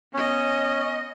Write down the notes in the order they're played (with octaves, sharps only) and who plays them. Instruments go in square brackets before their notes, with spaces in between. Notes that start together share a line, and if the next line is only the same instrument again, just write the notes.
[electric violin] B3 D#5 [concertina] C#4